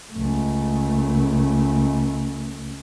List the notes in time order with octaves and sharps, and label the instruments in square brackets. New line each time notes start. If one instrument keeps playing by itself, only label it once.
[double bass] C#2 A3